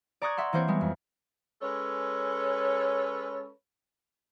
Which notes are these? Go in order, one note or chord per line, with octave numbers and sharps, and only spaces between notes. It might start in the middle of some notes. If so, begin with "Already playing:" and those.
D5 A#5 C#6 D#6 F#6 G#6
E5 F#5 C6
E3 A#3 C4 C5 C#5
G3 G#3 B3
F2
G#3 C#4 A4 B4 C#5